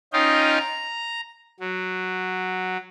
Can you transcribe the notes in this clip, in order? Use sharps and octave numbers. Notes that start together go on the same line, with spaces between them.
C#4 D#4 F4 D#5 F5 G5
A#5
F#3